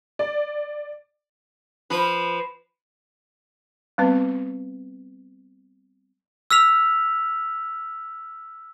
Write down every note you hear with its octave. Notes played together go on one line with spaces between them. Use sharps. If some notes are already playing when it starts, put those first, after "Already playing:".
D5
F3 B4
G3 B3 C4 B4
E6 F6 B6 F7